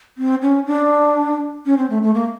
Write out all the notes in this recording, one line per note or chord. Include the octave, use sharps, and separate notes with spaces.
C4
C#4
D4
C#4
C4
A3
A3
A#3